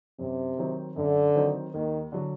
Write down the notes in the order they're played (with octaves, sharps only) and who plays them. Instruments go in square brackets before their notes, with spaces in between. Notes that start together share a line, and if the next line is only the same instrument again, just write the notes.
[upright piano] F#2 [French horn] C3
[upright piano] D#3 F#3 C4 D#4
[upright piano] F#2 [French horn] D3
[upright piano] D#3 F#3 C4 D#4
[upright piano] D#2 [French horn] D#3
[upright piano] D3 F#3